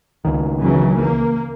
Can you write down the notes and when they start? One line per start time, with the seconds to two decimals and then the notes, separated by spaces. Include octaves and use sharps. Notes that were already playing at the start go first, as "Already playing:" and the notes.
0.25 C#2 D#3
0.60 C#3 E3 F#3
0.99 A#3